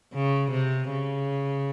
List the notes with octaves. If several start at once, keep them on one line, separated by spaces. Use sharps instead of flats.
C#3
C3
C#3